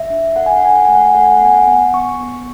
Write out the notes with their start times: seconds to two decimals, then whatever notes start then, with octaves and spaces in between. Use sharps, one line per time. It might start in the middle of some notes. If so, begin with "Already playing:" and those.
Already playing: E5
0.10 D4
0.36 A4 F#5
0.46 G#5
0.56 F#5
0.62 A4 G#5
0.75 F#5
0.85 A3 G#5
0.95 F#5
1.05 G#5
1.14 A4 F#5
1.24 G#5
1.35 F#5
1.41 B3 G#5
1.54 F#5
1.67 B3
1.94 B3 C#6
2.21 B3